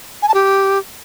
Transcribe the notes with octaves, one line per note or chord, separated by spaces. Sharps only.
G#5
A5
G4